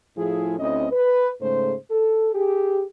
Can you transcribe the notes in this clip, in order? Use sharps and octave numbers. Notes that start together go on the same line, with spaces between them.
A2 F3 E4 F4 G#4
D2 C4 C#4 E4 D#5
B4
G#2 C#3 A3 C5
A4
G4 G#4